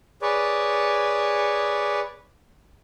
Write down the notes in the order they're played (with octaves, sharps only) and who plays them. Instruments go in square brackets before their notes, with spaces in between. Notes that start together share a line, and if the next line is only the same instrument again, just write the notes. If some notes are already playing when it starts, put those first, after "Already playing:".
[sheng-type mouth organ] G#4 B4 C#5 D5